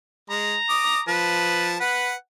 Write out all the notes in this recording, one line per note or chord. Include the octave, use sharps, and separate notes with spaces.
G#3 A#5
D6 D#6
F3 B4 A5
B4 F#5